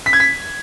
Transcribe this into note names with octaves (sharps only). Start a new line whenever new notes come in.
B6
G#6
B6